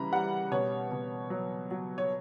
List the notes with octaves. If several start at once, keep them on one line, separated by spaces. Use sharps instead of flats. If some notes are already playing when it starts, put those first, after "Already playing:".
Already playing: C#3 E3 G3 A#5 B5
G3 F#5
B2 C#5
B2
F#3
F#3
C#5